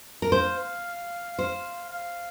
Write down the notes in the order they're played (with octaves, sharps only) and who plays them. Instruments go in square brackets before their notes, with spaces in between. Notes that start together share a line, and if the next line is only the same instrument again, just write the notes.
[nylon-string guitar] A#4
[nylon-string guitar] C5 [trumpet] F5
[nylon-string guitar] C5
[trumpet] F5